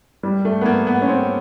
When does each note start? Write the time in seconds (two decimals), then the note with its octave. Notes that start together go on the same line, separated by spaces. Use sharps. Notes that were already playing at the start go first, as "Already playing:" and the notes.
0.23 G3
0.45 A3
0.61 B3
0.65 A#3
0.87 B3
1.02 C#4
1.08 C4